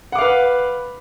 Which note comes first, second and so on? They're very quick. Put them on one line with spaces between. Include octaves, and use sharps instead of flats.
F#5 D6 F5 B4